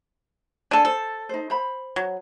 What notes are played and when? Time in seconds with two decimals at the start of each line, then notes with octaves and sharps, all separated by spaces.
0.71 D4 A4 G#5 A5
0.85 A4 C5
1.29 D#4 C5
1.50 C5 B5
1.96 F#3